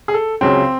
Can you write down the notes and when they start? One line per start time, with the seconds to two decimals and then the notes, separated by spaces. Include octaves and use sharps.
0.08 G#4
0.14 A4
0.41 C#2 C#3 F#3 C4